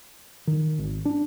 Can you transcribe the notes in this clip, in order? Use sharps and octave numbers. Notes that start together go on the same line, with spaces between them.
D#3
G#1
D4